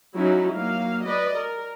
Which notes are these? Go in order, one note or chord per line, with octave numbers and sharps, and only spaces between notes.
F#3 C#4 D#4 E4
F#3 A#3 F5
B4 D5 D#5
A#4